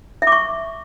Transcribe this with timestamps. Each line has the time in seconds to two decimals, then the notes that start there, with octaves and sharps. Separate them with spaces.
0.22 E5
0.27 D6
0.32 C#6